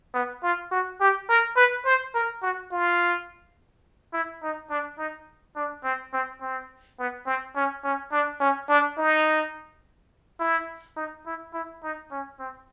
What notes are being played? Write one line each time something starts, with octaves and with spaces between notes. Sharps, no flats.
B3
F4
F#4
G4
A#4
B4
C5
A#4
F#4
F4
E4
D#4
D4
D#4
D4
C4
C4
C4
B3
C4
C#4
C#4
D4
C#4
D4
D#4
E4
D#4
E4
E4
D#4
C#4
C4